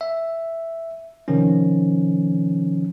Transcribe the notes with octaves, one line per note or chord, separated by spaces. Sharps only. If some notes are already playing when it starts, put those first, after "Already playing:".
E5
C3 D#3 F3 C#4